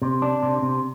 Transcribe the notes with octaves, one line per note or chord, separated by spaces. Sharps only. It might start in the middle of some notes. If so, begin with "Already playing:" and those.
C3
D4
C3
C3